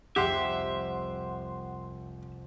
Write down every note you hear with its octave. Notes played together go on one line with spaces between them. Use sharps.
C2 F2 G4 E5 F#5 C6